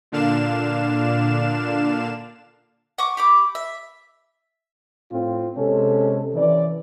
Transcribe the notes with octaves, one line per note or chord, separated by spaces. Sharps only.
A#2 D3 D4 F5 E7
F#5 C#6 D6
G4 B5 D6
E5
A2 C4 F4
C3 G#3 C#4 A4
C3 E3 C#4 D5